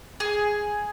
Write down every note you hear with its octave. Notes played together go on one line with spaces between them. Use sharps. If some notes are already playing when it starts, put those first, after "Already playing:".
G#4